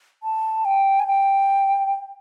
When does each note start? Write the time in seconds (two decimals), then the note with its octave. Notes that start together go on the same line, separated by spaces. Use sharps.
0.23 A5
0.65 G5
0.99 G#5
1.07 G5